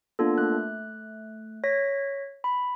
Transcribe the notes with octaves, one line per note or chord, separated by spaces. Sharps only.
A#3 B3 D4 F4 A4
A3 F#6
C#5 A#6 B6
B5